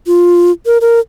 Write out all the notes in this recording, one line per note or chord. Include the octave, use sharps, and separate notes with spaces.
F4
A#4
A#4